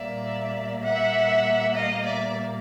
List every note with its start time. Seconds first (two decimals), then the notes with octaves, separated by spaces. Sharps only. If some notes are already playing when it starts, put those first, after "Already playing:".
Already playing: A#2 G3 A#3 D5 E5
0.82 E5 F#5
1.74 D#5 F5
2.05 D5 E5